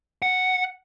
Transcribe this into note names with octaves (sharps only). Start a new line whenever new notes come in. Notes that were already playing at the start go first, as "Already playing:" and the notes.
F#5